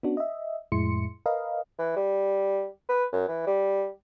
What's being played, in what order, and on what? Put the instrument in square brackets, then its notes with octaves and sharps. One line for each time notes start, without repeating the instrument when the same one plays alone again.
[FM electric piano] B3 C#4 D4 F#4
D#5 E5
F2 A2 G#3 E4 C6 C#7
A#4 B4 D#5 F5
[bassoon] E3
G3
B4
F#2
E3
G3